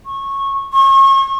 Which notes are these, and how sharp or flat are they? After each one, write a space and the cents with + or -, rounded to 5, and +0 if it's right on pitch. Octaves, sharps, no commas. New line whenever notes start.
C#6 -15
C#6 -35